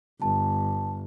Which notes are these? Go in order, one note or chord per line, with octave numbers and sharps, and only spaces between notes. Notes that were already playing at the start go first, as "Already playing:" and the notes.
G1 A5